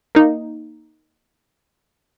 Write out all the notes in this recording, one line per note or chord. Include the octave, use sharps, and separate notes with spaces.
A#3 D#4